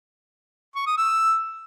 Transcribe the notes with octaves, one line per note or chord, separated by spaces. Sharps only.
C#6
D#6
E6